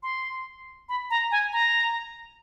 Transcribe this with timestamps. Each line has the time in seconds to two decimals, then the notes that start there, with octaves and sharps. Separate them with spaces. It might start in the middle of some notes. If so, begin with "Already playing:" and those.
0.03 C6
0.89 B5
1.10 A#5
1.31 G#5
1.53 A#5